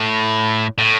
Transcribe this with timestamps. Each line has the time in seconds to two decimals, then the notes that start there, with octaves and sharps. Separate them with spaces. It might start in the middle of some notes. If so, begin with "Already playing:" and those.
Already playing: A2
0.78 A2